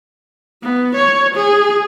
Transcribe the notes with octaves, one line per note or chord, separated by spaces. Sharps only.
B3
C#5
G#4